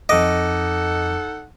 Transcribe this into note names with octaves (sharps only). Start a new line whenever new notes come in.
F2 D#4 A4 D#5 F#5 D6